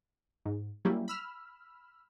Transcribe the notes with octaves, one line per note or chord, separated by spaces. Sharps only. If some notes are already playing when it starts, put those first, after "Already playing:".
G#2
F#3 G3 A#3 C#4 E4 G4
B5 E6 F6